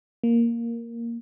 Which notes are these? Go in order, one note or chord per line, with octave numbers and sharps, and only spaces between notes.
A#3